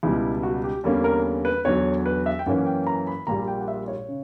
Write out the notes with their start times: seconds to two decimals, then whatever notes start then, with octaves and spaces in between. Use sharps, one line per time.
0.03 C#2 B2 G3 E4
0.43 F#4
0.64 G4
0.84 E2 D3 G3 A#3 C#4
1.04 A#4
1.45 B4
1.65 E2 D3 F#3 C#5
2.06 B4
2.26 E5
2.39 G5
2.46 F#2 E3 A#3 C#4 F#5
2.66 G5
2.87 A#5
3.07 B5
3.27 A#1 A#2 G3 A#5
3.47 G5
3.60 F#5
3.68 E5
3.88 C#5
4.08 C#3